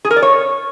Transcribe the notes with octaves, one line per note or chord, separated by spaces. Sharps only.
G#4
A#4
D5
C#5